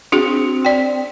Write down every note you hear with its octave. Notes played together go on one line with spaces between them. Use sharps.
C4 D4 F#4 G#4
D5 G5